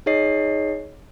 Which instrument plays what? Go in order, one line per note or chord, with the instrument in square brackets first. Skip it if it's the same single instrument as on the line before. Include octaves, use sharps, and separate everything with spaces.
[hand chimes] D#4 G#4 C#5 D#5 C7